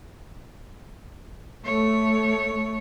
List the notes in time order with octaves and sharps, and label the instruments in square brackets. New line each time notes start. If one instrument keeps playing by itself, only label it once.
[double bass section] A3 [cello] C#5